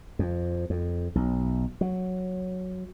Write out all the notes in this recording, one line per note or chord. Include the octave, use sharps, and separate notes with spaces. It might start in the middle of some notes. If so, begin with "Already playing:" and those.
F2
F2
B1
F#3